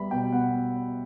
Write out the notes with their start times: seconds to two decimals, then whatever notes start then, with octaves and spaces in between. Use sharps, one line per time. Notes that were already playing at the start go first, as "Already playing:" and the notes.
Already playing: G3 B3 E5 B5
0.11 B2 G5
0.32 B2 F#5